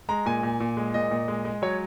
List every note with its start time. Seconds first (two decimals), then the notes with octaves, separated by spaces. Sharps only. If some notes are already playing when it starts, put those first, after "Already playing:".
0.09 G#3 A#5
0.26 A#2 G#5
0.43 A#2
0.60 A#2
0.77 G#3
0.94 A#2 D#5
1.11 A#2
1.28 G#3
1.45 G#3
1.62 F#3 C#5